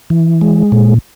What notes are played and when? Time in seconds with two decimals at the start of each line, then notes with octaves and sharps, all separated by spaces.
0.10 E3
0.41 G#3
0.72 A#2